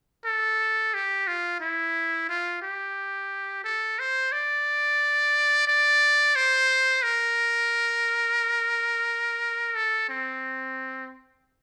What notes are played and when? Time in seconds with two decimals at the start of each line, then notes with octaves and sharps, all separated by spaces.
0.25 A4
0.94 G4
1.27 F4
1.61 E4
2.29 F4
2.62 G4
3.64 A4
3.99 C5
4.32 D5
5.67 D5
6.35 C5
7.03 A#4
9.75 A4
10.09 C4